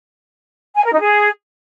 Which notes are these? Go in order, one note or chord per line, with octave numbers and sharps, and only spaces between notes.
G#5
A#4
D#4
G#4